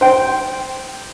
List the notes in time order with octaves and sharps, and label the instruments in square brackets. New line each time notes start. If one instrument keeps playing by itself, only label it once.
[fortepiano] C5 G5